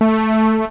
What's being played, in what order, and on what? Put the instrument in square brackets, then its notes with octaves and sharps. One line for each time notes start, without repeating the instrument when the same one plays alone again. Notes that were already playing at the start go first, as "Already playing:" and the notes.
[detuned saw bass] A3